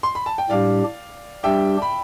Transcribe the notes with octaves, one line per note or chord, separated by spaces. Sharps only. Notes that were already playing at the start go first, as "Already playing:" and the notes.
C6
B5
A5
G5
A2 G3 D4 G4 D5 F5
G3 D4 G4 E5 G5
B5